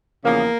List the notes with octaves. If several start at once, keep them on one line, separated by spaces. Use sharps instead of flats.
E2 C#3 F3 A#3